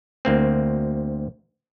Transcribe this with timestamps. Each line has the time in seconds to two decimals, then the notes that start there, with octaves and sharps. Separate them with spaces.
0.25 D2 A#3 C4